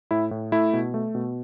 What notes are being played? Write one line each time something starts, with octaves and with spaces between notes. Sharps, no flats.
A2 E4
A2
A3 E4
B2
A3
B2